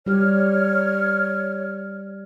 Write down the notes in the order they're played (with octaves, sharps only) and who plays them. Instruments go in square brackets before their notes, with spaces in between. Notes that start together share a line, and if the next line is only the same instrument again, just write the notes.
[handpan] G3 G4 [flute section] C#5 F6